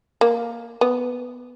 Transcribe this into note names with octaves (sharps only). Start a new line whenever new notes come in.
A#3
B3